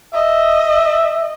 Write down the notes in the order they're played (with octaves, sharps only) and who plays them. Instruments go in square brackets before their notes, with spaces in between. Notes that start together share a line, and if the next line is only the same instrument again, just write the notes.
[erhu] D#5 [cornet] E5